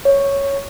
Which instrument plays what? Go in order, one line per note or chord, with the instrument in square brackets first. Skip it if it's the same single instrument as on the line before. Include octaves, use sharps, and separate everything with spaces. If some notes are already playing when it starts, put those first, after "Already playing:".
[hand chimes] C#5